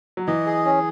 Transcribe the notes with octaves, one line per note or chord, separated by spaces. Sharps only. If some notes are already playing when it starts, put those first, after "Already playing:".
F#3
E3 D#5
G#4
C#4